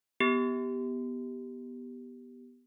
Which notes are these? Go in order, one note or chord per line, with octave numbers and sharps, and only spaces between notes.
B3 G4